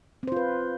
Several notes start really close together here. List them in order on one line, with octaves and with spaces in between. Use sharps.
C4 C5 F4 B4